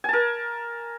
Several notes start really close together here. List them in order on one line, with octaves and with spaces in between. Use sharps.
G#5 A5 A#4